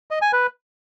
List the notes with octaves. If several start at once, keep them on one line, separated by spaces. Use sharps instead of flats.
D#5
G#5
B4